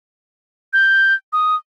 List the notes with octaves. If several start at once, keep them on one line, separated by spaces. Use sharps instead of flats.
G6
D#6